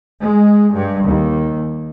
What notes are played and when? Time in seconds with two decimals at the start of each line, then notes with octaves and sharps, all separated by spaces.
0.24 G#3
0.74 G2
1.07 D#2